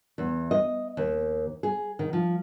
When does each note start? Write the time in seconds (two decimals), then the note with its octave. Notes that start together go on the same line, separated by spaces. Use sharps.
0.18 E2
0.51 D#5
0.97 D#2
1.63 G#4
1.99 D#3
2.13 F3